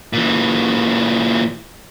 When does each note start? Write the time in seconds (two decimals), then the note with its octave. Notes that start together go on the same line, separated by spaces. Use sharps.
0.13 A#2 E3